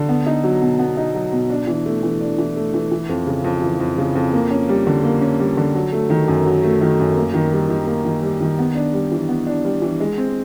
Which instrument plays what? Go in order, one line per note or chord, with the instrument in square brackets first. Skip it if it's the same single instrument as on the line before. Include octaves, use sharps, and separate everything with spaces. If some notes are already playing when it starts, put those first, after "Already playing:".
Already playing: [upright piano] D3
B3
D#4
F#3
B2
B3
D#4
F#3
B2
D4
E3
A3
E3
D4
E3
A3
E3
E3
F2
C#3
F2
E3
F2
C#3
F2
A#3
C#4
G3
D3
A#3
C#4
G3
D3
F#3
A3
D#3
F#2
F#3
A3
D#3
F#2
A#3
D#3
G3
D#3
A#3
D#3
G3
D#3
B3
D4
G3
E3
B3
D4
G3
E3
G#3
C4